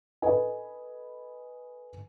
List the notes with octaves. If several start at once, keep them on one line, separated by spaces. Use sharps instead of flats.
A4 B4 D#5 G#5